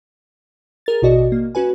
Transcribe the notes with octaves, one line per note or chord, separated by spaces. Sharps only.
G#4 A#4 A6
A1 B2 F#4 D5 D#5
A#3
C#4 F#4 B4 G#5